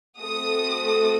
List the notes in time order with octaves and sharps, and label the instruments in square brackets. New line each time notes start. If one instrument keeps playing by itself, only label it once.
[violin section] A3 C4 F#4 A4 D#6